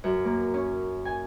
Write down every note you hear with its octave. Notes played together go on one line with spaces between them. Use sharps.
F#2
A#3
C#4
G#5